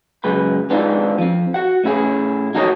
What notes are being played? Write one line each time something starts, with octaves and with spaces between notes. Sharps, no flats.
C#2 F#2 G#3 B4 B5
G#3 B3 C4 D4 D#4 F4
F3 C4
F#4 F#5
A2 C#4 E4 G#4
D#4 F#4 A4 A#4 C#5 D#5